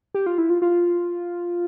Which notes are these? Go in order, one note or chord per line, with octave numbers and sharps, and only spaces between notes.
G4
F4
E4
F4
F4